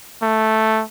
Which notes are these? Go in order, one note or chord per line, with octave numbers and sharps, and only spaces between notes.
A3